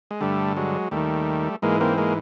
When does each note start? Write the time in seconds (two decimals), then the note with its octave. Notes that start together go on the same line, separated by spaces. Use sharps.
0.11 G#3
0.21 G2 D3 G3 A3
0.57 F#3 G#3
0.91 D#2 D#3 G3 A3
1.62 G#2 E3 G#3 A#3
1.80 A#3 C4
1.98 G#3 A#3